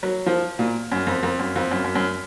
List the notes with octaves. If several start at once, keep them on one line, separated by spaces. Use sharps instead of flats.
F#3
F3
A#2
F#2
F2
F2
F#2
F2
F#2
F#2
F#2